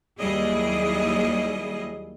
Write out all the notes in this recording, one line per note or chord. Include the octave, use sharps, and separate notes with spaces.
D#2 F#3 G3 E4 G#4 D#5